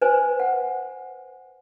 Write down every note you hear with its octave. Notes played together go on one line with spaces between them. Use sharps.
B4 C5 G#5
F#5